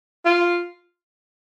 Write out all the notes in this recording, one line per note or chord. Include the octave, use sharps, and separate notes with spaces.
F4